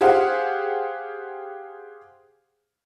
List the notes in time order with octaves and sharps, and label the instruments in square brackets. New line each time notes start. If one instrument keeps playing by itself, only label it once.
[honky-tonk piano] G4 G#4 C5 F5 F#5